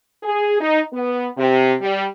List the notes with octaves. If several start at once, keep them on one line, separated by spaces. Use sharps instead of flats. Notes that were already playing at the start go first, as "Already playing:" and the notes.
G#4
D#4
B3
C3
G3